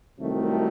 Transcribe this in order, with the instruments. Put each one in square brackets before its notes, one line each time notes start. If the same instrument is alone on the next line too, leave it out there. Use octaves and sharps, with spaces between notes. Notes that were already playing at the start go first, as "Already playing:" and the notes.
[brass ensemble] C2 C3 D#3 F#3 A3